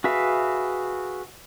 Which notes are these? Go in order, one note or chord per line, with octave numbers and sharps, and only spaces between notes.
F#4 G#4 B4 E5 F5